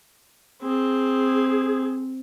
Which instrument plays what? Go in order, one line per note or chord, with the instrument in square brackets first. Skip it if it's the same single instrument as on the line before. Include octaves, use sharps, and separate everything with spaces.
[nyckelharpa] C4 [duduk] G#4